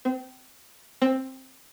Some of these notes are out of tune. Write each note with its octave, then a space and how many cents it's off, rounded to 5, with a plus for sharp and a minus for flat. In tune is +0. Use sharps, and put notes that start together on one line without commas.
C4 -25
C4 +10